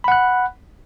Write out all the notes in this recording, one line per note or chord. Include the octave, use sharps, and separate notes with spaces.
F#5 B5 F#6